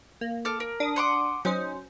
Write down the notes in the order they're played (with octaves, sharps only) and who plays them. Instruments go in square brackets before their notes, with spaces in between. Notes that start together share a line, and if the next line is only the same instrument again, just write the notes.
[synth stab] A#3
[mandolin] A4 D6 F6
A#4
[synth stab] D4 D#6
[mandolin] F#5 C6 D6
[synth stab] F#3 C#4 C5 [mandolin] D#4